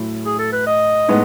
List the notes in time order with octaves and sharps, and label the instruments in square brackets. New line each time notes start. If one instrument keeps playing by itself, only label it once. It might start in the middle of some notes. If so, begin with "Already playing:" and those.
Already playing: [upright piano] A2 F#3 A3 E4
[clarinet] G#4
A4
B4
D#5
[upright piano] A2 G#3 B3 D#4